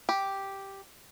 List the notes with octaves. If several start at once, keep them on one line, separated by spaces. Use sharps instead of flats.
G4